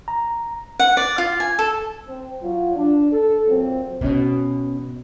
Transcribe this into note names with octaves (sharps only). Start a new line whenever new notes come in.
A#5
F#5
D5
F4
G#5
A4
C4
F#3 F4
D4
A4
A#2 F#3 C4
B2 B3 C#4